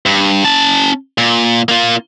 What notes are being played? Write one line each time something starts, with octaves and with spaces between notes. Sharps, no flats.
G2
C#4 A5
A#2
A#3 F4